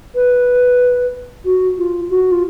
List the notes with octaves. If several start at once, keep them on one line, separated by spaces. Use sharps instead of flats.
B4
F#4
F4
F#4
F4